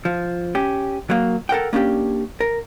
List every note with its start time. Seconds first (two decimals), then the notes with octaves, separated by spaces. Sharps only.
0.05 F3
0.55 C#4 G4
1.10 F#3 A#3
1.49 A4 A#4 F#5 G5
1.73 A#3 C#4 D4 G4
2.40 A#4